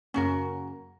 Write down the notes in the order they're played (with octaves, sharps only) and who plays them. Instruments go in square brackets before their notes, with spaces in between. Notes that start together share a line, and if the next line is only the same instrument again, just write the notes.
[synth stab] F#2 C#3 A#3 [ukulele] C#4 F#4 A#4